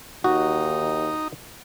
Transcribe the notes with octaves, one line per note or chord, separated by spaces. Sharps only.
D#2 D#4 F#4